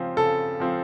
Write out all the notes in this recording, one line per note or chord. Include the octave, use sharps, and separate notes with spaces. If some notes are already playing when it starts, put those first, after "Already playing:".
Already playing: C#3 F3 C4
C#3 A4
F3 C4